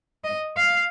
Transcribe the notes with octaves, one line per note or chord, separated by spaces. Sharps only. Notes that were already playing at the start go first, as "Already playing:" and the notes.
D#5
F5